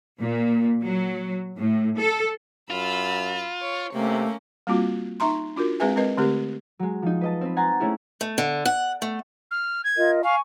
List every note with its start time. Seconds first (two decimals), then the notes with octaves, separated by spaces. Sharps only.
0.20 A#2
0.83 F#3
1.58 A2
1.98 A4
2.70 F#2 F4 B5 E6
3.62 C#5
3.93 C3 A3 A#3 C#4
4.67 G3 A#3 C4 F4 F#4
5.20 D#4 E5 A#5 C6
5.56 D4 F4 F#4 A#4
5.80 G#3 C4 G#4 B4 E5 G#5
5.96 G#3 C4 A#4 B4 D#5
6.17 D3 A3 C4 G4 A#4
6.79 F#3 G#3
7.02 F3 D#4
7.21 B4 D#5 A5
7.41 C4 B4
7.56 F#5 G#5 A#5 C6 A6
7.80 A3 C#4 E4 G#4
8.21 A3
8.38 D3
8.65 F#5
9.02 A3
9.51 F6
9.84 G#6
9.97 F4 A#4 D#5
10.23 F5 G#5 C#6